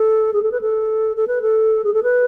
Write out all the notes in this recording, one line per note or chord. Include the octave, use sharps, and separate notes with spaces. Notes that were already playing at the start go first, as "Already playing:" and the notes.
Already playing: A4
G#4
A4
B4
A4
A4
B4
A4
G#4
A4
B4